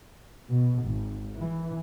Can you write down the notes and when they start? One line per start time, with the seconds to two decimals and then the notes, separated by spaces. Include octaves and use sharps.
0.49 B2
0.83 G#1
1.38 E3